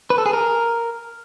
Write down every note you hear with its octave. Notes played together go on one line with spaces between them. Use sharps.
B4
A4
G#4
A#4